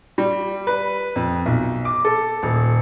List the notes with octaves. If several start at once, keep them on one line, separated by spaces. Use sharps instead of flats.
G3
B4
F2
B1
D6
A4
D#1